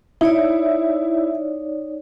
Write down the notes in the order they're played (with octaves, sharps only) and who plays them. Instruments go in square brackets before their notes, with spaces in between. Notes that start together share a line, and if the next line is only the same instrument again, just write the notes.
[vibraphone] D#4 C#5 D5 [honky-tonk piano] E4